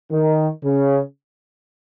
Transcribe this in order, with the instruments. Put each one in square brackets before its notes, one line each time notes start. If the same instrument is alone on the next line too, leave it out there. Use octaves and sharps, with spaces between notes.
[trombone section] D#3
C#3